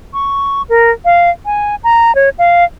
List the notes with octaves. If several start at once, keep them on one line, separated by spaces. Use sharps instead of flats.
C#6
A#4
F5
G#5
A#5
C#5
F5